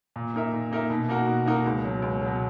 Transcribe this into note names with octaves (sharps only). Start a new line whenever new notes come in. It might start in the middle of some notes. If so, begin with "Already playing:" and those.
A#2
A#3 D#4 A#4 E5
A#2
A#3 D#4 A#4 E5
B2
A#3 D#4 F#4 A#4
B2
A#3 D#4 F#4 A#4
C#2
B2 F#3
C#2
B2 F#3